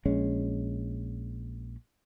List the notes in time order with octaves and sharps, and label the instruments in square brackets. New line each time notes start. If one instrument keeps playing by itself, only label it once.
[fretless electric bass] A#1 G#3 C#4